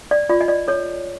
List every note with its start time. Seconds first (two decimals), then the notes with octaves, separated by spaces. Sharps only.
0.11 D5
0.29 F4 D5
0.41 D#5
0.48 D5
0.68 A4 C#5